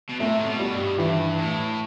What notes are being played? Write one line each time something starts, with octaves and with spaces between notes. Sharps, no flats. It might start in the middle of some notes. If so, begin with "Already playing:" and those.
B2
C3 A3
A2
B2
G3
G2
G2 E3
A2